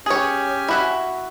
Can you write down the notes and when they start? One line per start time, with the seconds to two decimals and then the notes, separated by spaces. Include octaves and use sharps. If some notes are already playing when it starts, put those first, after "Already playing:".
0.06 C#4 G4 G#4 C#5 G#5
0.68 E4 F#4 E5